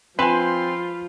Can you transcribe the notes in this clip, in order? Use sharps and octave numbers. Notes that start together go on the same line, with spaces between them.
F3 C4 F4 B4 G#5 C6